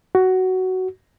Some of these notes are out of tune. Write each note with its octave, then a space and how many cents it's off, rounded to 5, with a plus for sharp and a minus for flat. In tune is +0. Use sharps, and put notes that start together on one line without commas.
F#4 +10